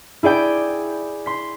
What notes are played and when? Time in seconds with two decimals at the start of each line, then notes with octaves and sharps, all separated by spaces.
0.23 E4 G#4 D5 G5
1.26 C6 B6